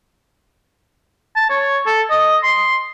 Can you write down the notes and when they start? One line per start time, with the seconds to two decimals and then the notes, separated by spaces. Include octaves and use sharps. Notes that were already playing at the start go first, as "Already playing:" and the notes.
1.36 A5
1.50 C#5
1.86 A4
2.10 D#5
2.43 C6